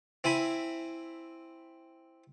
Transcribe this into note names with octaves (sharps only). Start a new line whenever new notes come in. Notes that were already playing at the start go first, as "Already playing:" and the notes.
C4 E4 G#5 B5